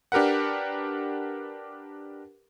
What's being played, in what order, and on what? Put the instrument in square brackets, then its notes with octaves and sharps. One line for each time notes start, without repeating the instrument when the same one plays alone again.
[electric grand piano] D4 G4 A#4 B4 F#5